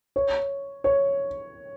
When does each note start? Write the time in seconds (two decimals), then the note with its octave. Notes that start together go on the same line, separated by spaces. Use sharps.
0.16 C#5
0.84 C#5